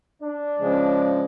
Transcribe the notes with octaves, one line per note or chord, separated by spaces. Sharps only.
D4
C#3 F3 G#3